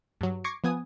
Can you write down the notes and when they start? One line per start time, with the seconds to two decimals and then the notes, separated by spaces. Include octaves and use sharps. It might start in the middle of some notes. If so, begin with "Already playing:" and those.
0.21 G2 F#3
0.44 C#6 D6 G#6 A#6 C7 C#7
0.64 F3 B3 G#5 D#6